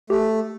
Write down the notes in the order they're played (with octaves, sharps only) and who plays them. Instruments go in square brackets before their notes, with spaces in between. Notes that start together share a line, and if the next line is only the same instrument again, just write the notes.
[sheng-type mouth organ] A3 [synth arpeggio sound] G4